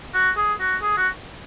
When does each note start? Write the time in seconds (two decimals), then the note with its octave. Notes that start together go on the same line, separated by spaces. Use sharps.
0.14 F#4
0.37 G#4
0.60 F#4
0.82 G#4
0.97 F#4